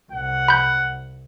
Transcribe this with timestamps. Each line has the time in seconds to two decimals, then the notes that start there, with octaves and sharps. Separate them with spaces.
0.12 C2 F#5
0.48 B5 G6